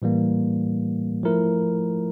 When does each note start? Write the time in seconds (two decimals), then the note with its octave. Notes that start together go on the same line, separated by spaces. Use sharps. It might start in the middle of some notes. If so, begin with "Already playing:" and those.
0.02 A2 E3 G3 A#3
1.23 F3 A3 E4 A#4